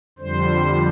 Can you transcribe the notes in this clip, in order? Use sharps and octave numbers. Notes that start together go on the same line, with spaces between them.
F2 D3 G3 C5